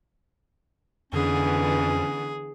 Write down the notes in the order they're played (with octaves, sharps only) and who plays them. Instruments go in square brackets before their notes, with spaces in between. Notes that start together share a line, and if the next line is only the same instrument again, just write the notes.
[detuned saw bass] F2 [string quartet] D3 E3 B3 [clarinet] C#4 [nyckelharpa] G#4